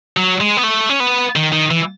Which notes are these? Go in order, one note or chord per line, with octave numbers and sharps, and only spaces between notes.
F#3
G#3
B3
A3
C#4
B3
D#3
D#3
E3